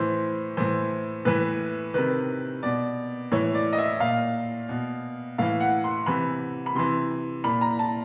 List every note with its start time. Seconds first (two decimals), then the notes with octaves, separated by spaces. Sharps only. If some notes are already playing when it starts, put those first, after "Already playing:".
Already playing: A2 E3 C5
0.57 A2 E3 C5
1.25 A2 E3 B4
1.94 C3 D#3 B4
2.63 B2 D5
3.32 A2 E3 C#5
3.55 D5
3.73 D#5
3.78 E5
4.00 A#2 F5
4.69 B2
5.38 A2 E3 F5
5.60 F#5
5.84 C6
6.06 C3 E3 B5
6.66 B5
6.75 C3 E3 C6
7.44 A#2 B5
7.61 A#5
7.79 A5